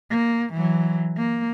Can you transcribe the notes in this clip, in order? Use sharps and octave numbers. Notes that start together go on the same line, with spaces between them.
A#3
E3 F#3
A#3